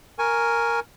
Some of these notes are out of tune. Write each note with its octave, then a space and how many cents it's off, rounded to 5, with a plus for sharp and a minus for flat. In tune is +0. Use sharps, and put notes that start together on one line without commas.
A#4 +0 G#5 +0 C#6 +0